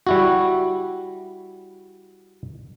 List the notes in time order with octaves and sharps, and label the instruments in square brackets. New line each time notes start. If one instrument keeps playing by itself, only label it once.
[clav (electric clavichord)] G3 E4 F#4